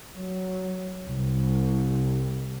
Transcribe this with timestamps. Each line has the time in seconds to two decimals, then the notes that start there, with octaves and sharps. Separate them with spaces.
0.14 F#3
1.05 C2